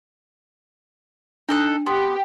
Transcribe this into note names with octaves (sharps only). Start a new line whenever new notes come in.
D4 D#4 A4 F#6
B3 G4 C6